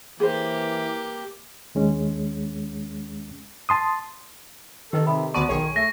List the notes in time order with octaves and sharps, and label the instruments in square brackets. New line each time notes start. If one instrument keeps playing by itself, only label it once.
[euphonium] E3 [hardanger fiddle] A#3 G4 [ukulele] G#4 C5
[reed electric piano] D#2 G#3 C#4
A5 C6 D#6
[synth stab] D#3 [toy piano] G4 B4 D#5 [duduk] A4
[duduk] C3 [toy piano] A4 B5
[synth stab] D2 D5 [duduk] B3 [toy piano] A5 C6 [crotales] C#6
[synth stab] B1 G#4 C#5 [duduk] D#3
[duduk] A3 [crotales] A#6